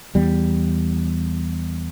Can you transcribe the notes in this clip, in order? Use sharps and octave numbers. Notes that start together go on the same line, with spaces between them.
E2 G3